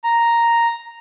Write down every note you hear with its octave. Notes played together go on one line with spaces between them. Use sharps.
A#5